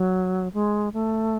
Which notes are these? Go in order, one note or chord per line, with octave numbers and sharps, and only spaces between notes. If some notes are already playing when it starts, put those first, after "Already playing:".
Already playing: F#3
G#3
A3